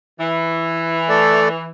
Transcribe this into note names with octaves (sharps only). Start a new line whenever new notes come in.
E3
A3 A4 D5